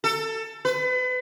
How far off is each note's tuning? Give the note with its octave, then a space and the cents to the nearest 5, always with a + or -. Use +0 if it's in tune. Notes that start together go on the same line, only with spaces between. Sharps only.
A4 +20
B4 +35